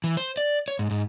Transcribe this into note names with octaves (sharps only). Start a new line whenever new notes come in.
E3
C5
D5
C#5
G#2
G#2